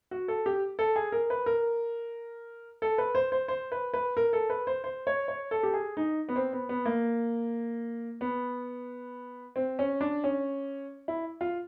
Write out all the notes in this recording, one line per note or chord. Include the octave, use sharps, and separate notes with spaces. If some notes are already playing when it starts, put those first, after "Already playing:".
F#4
A4
G4
A4
G#4
A#4
B4
A#4
A4
B4
C5
C5
C5
B4
B4
A#4
A4
B4
C5
C5
C#5
C#5
A4
G4
G#4
D#4
B3
C4
B3
B3
A#3
B3
C4
C#4
D4
C#4
E4
F4